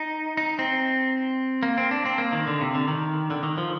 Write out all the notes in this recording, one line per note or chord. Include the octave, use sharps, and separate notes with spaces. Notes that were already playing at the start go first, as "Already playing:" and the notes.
Already playing: D#4
D#4
C4
A#3
C4
D4
C4
A#3
D#3
D3
C3
D3
D#3
D3
D#3
F3